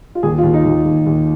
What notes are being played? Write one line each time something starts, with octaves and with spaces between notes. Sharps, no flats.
F4
D#2 G#4
F4
D#2
D#4
D#2 F4
D#2
D#2